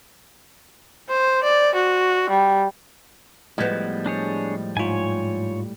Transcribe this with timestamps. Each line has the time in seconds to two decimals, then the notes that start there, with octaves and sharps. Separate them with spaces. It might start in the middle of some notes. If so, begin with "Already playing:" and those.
1.09 C5
1.43 D5
1.75 F#4
2.30 G3
3.58 A2 F3 G3 G#3 B3 D#5
4.06 D4 G#4 C#5
4.77 G#2 F4 C#5 G#5